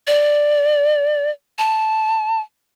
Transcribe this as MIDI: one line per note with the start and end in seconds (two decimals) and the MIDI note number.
0.07 1.30 74
1.59 2.40 81